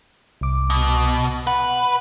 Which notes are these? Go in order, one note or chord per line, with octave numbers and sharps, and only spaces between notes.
C2 D6
B2
B4 F#5